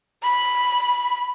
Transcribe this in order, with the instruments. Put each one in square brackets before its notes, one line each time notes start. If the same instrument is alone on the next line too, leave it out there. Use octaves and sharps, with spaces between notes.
[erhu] B5